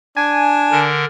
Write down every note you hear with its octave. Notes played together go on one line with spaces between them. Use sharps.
D4 G#5
D3 A#4